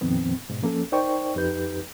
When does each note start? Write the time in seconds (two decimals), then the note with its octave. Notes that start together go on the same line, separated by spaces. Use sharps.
0.01 F2 A#2 D#3 F3 B3 C4
0.50 G#2 B2
0.62 F3 A#3 C#4 A4
0.92 D#4 A#4 C5 D5 G5 C#6
1.35 F2 D#4 G4 B4 G6